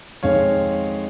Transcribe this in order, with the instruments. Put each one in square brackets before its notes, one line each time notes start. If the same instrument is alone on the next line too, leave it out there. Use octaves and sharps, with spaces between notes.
[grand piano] F2 D#3 G#3 C#5 F5